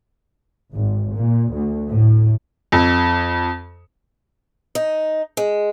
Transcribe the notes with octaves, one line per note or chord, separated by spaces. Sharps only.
G#1
A#2
D2
A2
F2
D#4
G#3